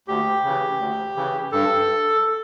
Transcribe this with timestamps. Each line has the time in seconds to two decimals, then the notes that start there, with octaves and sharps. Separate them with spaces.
0.08 D2 G4
0.44 C#3 E3
0.80 D2
1.16 C#3 E3
1.52 G2 A4